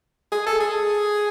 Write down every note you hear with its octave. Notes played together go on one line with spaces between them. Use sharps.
G#4
A4
G#4